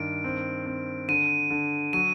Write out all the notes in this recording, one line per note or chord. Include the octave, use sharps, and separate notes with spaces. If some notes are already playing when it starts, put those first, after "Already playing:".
Already playing: G2 D#3 D7
C4
C4
D3 D#7
D3
F#3 D#7